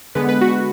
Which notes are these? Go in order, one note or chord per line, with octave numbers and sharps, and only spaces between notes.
D3 G#3 B3 B4
B4
F#4